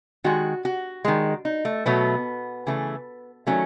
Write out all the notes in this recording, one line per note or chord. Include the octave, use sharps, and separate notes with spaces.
D#3 G#3 F#4
F#4
D#3 G#3
D#4
A3
B2 F#3 A3 B3
C#3 E3 A3
D#3 F#3 A3 C#4